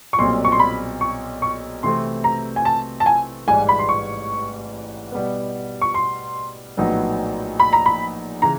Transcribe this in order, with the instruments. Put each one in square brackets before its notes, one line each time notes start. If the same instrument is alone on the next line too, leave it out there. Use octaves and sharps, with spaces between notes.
[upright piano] C#6
[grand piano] B1 A#2 G3 C4 [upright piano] C6
[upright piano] C#6
C6
B5
C#6
C#6
[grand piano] C3 E3 A3 C4 [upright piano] C6
[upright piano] A#5
G#5
A5
A5
G#5
[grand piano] A1 G#2 E3 G3 [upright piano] G#5
[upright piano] B5
C6
C#6
[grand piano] B2 G3 B3
[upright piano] C#6
C6
[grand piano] A#1 A2 F#3 B3 D#4
[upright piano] B5
A#5
B5
[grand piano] C#3 E3 [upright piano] A#5